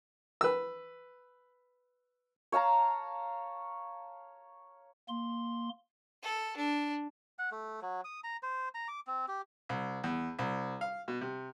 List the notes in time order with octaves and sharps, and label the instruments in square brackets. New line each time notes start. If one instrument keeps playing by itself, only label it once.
[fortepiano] B4 E6
[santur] C#5 F5 A5 A#5
[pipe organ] A#3 C6
[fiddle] A4
D4
[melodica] F#5
A3
F#3
D#6
A#5
C5
A#5
D6
C4
G4
[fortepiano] C2
E2
C2
F5
B2
C3